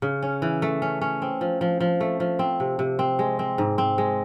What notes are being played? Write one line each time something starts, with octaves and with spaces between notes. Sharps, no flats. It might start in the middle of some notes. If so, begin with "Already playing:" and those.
C#3
C#4
E3
A3
C#4
C#4
C4
F3
F3
F3
A3
F3
C4
C3
C3
C4
G#3
C4
G#2
C4
G#3